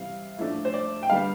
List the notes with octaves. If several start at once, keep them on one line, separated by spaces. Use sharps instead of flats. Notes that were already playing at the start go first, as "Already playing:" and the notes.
Already playing: C3 E3 G3 C4 F5
A2 F3 A3 D4
C5
D5
G5
D3 G3 B3 F5